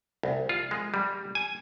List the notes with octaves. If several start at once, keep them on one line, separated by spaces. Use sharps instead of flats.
C2
F4
G#3
G3
G#5